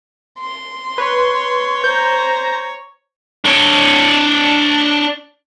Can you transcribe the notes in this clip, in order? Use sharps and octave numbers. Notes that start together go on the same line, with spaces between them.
C6
B4 C#5
C5 A#5 G6
D4 C#5